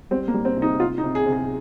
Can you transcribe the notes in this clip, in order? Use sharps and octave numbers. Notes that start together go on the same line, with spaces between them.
G3 C4
A#3
G3
C4
C3
D#4
C3 F4
D#4
C3
G#4
C3
G#4